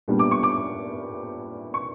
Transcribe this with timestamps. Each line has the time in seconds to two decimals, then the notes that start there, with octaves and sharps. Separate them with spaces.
0.08 A#2 G3 B3 D4
0.19 D6
0.31 C#6
0.43 D6
1.74 C#6